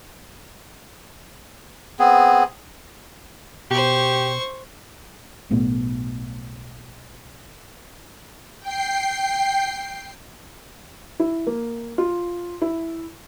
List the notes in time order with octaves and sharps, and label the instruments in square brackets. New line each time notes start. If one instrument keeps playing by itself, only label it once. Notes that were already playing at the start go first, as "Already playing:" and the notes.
[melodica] B3 C4 G#4
[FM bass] B2 [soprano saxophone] G4 [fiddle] C5 C#6
[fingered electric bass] B1 A2 A3 B3
[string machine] G5 C7
[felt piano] E4
A#3
F4
E4